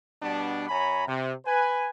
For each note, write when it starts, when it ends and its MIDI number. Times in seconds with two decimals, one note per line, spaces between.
0.23 0.68 47
0.23 0.68 55
0.23 0.68 59
0.23 0.68 62
0.69 1.07 42
0.69 1.07 73
0.69 1.07 80
0.69 1.07 82
0.69 1.07 83
1.07 1.32 48
1.45 1.89 71
1.45 1.89 80